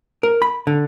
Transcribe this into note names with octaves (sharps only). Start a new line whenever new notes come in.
A#4
B5
D3